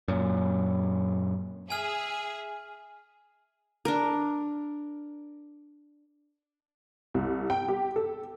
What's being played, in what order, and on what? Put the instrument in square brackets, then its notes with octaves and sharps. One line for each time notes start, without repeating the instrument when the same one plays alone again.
[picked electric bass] F#2 A#2
[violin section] G#4 E5 [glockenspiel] G#5 F6
[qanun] D4 A#4
[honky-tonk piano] C2
G5
G4
A4